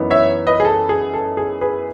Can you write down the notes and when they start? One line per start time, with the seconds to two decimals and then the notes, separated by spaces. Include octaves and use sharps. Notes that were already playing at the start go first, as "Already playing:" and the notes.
Already playing: F#2 E3 B3 D#4
0.10 C#5 E5
0.47 B4 D#5
0.60 G#4
0.65 A4
0.89 G#4
1.14 A4
1.37 G#4
1.61 G#4 B4